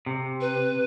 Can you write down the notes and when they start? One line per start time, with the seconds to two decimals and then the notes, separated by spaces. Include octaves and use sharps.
0.06 C3
0.41 B4